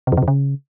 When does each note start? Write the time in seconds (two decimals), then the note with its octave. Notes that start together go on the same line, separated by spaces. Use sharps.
0.07 C3
0.12 F2
0.17 C3
0.23 F2
0.28 C#3